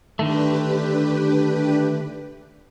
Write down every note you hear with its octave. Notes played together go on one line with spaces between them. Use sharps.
D3 D#3 A3 D4 G4 B4